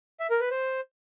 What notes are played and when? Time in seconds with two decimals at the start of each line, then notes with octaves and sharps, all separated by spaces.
0.20 E5
0.30 A#4
0.40 B4
0.51 C5